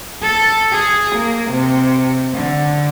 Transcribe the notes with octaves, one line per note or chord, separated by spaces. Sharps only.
A4
G#4
A#3
C3
D3